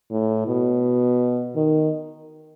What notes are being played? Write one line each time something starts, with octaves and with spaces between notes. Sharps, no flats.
A2
B2
D#3